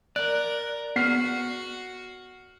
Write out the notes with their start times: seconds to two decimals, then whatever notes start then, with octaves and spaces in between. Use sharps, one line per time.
0.16 A#4 D5 F#6
0.96 B3 F#4 F6 C7